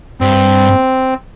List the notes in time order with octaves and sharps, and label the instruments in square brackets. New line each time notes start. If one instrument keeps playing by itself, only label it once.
[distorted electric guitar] G2 [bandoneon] C4